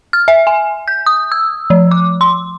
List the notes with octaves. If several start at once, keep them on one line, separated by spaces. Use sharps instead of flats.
F6
E5
G#5
G6
D#6
E6
F3
D6
C6